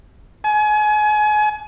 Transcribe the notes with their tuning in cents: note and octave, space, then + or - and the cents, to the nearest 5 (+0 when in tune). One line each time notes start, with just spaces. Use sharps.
G#5 +30